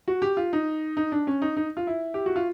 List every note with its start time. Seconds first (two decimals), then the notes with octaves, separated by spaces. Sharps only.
0.08 F#4
0.22 G4
0.37 F4
0.53 D#4
0.97 D#4
1.12 D4
1.27 C#4
1.42 D#4
1.57 D#4
1.77 F4
1.87 E4
2.14 G4
2.26 F#4
2.36 F4